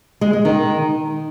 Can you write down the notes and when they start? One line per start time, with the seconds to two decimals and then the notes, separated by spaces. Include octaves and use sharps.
0.21 G#3
0.33 G#3
0.45 D#3